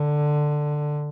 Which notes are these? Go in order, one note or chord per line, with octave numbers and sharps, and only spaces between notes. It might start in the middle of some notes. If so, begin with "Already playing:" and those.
Already playing: D3